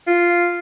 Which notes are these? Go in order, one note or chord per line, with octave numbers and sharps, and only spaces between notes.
F4